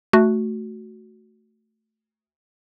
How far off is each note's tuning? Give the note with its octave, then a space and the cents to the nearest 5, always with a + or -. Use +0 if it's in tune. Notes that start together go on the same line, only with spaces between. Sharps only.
A3 +0 F#4 +0